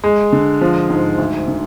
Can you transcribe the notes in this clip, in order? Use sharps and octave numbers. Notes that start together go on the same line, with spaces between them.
G#3
D3
F3
G#2
D2
D3